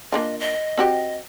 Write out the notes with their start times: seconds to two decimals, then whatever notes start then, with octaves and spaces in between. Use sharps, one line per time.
0.12 A#3 D4 F4 D#5
0.40 D#5
0.77 C4 F#4 G4